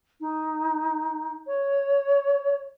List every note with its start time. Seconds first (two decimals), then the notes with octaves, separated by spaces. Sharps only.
0.21 D#4
1.47 C#5